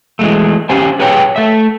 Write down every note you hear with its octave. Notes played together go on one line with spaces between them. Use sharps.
E3 G#3 A3
C#4 G4 C5 G#5
G#4 B4 C#5 G5 G#5 A#5
A3 E5